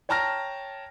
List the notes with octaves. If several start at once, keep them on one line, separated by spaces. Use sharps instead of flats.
C#5 G5 A5 A#5 F6 A#6